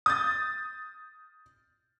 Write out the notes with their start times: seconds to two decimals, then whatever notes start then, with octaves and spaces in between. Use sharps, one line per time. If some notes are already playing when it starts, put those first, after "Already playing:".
0.06 D#6 G6 A6